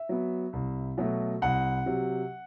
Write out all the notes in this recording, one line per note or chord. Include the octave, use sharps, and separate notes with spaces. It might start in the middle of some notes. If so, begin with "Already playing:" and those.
Already playing: E5
F#3 B3
C2
B2 F#3 A3
C2 F#5
C3 F#3